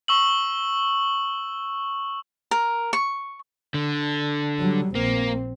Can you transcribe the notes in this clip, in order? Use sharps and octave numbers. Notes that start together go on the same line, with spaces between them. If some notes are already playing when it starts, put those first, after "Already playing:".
C#6 E6 F#7
A#4
C#6
D3
F#3 G3
A#1 A#3 C4